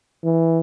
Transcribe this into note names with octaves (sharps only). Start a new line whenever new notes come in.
E3